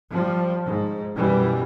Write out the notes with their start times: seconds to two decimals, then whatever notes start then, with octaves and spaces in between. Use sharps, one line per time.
0.11 F3 G3
0.65 G#2
1.15 F#2 B2 E3 G3